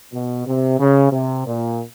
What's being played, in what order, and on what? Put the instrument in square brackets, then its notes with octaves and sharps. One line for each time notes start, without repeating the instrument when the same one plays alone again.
[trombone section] B2
C3
C#3
C3
A#2